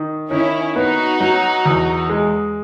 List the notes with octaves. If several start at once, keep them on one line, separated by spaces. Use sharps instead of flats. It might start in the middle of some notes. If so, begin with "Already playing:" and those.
Already playing: D#3
D#3 C#4 E4
B3 D#4 F#4
F#3
E2
G#3